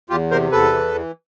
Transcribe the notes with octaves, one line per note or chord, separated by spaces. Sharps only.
E2 F4 G4
C3 A#4 C5
E2 A4 B4
E3
E3